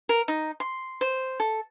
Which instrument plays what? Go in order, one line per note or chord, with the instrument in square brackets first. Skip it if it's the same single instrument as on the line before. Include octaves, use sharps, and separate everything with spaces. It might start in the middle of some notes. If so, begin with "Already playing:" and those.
[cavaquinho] A#4
D#4
C6
C5
A4